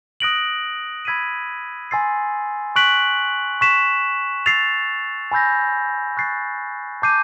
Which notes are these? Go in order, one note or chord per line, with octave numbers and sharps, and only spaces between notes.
D#6 F#6 A#6 D7 F#7
B5 E6 G#6 B6 D#7
G#5 C6 E6 A6 C7
C#6 F#6 B6 D7 F#7
C#6 F#6 B6 E7
E6 A6 C7 F7
G#5 B5 E6 G6 A#6
C#6 F#6 A6 C7
A5 D6 G6 C7 D#7